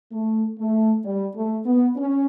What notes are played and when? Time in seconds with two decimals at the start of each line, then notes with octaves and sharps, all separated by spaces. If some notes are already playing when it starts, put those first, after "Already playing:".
0.12 A3
0.59 A3
1.05 G3
1.35 A3
1.66 B3
1.97 C#4